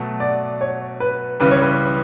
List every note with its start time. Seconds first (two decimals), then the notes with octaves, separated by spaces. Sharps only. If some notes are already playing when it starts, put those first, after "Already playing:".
Already playing: B2 F#3 A3
0.20 D5
0.61 C#5
1.00 B4
1.40 C#2 C#3 E3 G3 B4
1.51 C#5
1.62 B4